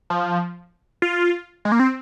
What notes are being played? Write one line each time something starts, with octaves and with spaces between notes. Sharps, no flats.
F3
F4
G#3
A#3
C4